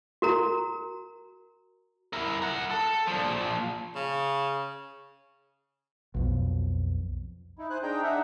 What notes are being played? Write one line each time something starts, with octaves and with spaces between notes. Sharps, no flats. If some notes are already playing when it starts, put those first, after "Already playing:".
F#4 A#4 A#5
E4 A#4
A#4 F#5
A4
A#2 F3
C#3
B1 F2 B2
D#4 E4
C5 G#5 F#6
D4 D#4 G#4 G5 A#5 G6
D4 D#4 E5 F#5